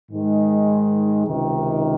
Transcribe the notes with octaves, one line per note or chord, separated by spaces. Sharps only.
G#2 D#3 G#3
C#2 C3 D#3